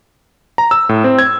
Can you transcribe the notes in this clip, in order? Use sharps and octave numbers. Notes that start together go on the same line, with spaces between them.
A#5
E6
A2
C4
G#6